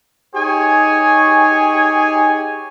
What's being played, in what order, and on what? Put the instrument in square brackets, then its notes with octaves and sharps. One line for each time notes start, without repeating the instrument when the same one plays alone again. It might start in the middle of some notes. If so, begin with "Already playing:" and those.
[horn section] D#4 G4 G#4 C#5 G#5